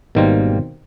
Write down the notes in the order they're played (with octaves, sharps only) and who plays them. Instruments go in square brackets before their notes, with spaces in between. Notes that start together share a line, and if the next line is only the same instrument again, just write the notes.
[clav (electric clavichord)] G#1 G3 A#3 [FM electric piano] B2 D#3 C4